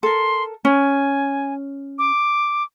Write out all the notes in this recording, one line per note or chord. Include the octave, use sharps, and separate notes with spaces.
A4 A#4 C6
C#4 G#5
D6